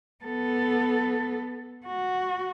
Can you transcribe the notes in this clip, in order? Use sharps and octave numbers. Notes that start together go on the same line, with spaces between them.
B3 A4
F#4